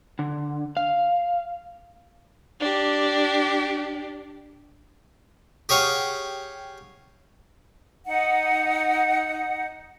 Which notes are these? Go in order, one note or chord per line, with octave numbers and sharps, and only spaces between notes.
D3
F5
D4 G4
G4 G#4 C#5 F5 F#5
D#4 F#5